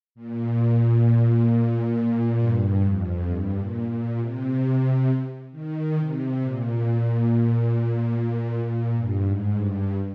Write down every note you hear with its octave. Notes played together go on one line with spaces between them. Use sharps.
A#2
G2
F2
G2
A#2
A#2
C3
D#3
C3
A#2
A#2
G2
G#2
G2